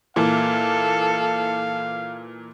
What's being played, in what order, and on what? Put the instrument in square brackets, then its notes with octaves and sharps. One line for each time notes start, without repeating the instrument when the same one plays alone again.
[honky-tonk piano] A#2 E3 A#3 [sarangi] A4 [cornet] F5